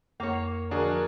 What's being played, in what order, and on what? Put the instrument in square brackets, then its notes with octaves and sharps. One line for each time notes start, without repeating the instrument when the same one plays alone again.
[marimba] F2 [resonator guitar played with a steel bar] A#3 C#5
[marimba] D3 F3 [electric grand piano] D4 F#4 G#4 [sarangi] A#4